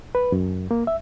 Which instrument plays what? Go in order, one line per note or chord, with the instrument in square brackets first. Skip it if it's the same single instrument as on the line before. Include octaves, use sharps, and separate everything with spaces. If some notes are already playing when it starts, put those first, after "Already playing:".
[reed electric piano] B4
F#2
A#3
E5